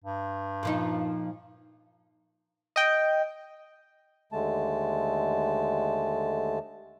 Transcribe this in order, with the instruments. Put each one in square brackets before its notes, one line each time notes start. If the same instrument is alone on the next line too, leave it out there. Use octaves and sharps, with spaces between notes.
[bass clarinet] G2
[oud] A#2 F3 D#4
[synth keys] D#5 G5
[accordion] D#2 D3 G#3 A3 A5